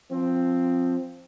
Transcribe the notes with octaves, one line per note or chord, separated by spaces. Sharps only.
F3 C4